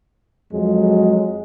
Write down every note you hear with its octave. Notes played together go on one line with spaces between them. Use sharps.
F2 F#3 G#3